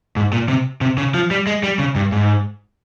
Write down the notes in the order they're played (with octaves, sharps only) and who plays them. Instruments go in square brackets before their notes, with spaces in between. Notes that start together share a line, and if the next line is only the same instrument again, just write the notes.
[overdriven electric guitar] G#2
A#2
C3
C3
C#3
F3
G3
G#3
G3
C#3
G2
G#2